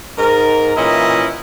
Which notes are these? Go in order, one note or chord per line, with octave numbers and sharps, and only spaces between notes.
G#2 A#4
A#2 E3 C#4 E4 D#5